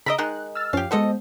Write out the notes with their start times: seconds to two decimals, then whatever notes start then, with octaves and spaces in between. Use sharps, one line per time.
0.06 C#3 D#5 E5 A#5 B5 D7
0.18 D#3 G#3 D#4 F#6
0.55 E6 F6 A6
0.73 F#2 F3 C#4 G4 F5
0.91 G#3 B3 F#4 A4 C5 D#5